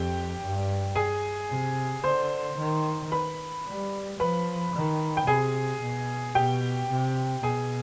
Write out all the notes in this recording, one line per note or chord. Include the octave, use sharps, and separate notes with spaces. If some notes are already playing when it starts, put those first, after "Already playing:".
Already playing: F2 G4 G5
G2
G#4 G#5
C3
D3 C5 C6
D#3
B4 B5
G3
F3 B4 B5
D#3
G5
C3 G#4 G#5
B2
B2 G4 G5
C3
B2 G#4 G#5